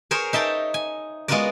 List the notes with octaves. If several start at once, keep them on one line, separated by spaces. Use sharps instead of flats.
G#4 A#4 C5 C#5
D#4 E5 G5 A5 A#5
G#5
G#3 B3 F4 F#4 A#4 D5